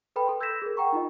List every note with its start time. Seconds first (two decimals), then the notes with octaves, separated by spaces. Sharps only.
0.16 A4 B4 G5 B5
0.27 A4 C6
0.40 E6 G6 G#6 A#6 B6 E7
0.62 G#4 A#4
0.77 F#5 G5 A#5 C#6
0.93 D#4 F4 D#5